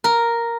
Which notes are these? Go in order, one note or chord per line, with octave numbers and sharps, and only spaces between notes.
A#4